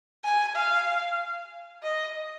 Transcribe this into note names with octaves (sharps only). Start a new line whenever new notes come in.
G#5
F5
D#5